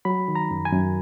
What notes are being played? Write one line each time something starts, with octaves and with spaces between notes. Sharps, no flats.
F#3 B5
D#3
A#5
F#2
G#5
F#2